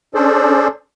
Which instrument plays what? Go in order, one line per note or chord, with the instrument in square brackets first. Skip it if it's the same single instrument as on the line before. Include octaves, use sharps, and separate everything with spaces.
[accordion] C#4 D4 G#4 A4 C5 D5